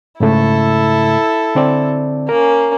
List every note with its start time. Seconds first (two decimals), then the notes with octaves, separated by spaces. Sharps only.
0.20 G#2 C#3 A3 E4 A4
1.55 D3 C4 D5
2.29 A#3 C#4 A#4